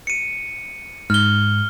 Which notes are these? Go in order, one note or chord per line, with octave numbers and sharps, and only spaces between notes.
C#7 D#7
G#2 F6 G7